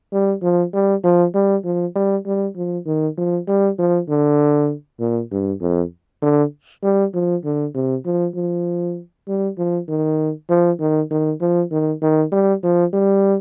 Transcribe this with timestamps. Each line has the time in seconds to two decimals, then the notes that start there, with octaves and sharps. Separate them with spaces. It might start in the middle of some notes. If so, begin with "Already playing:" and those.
0.13 G3
0.43 F3
0.74 G3
1.04 F3
1.35 G3
1.65 F3
1.96 G3
2.26 G3
2.57 F3
2.86 D#3
3.18 F3
3.48 G3
3.79 F3
4.09 D3
5.00 A#2
5.31 G2
5.61 F2
6.22 D3
6.83 G3
7.14 F3
7.45 D3
7.75 C3
8.06 F3
8.36 F3
9.28 G3
9.58 F3
9.89 D#3
10.50 F3
10.80 D#3
11.11 D#3
11.41 F3
11.71 D#3
12.02 D#3
12.32 G3
12.63 F3
12.93 G3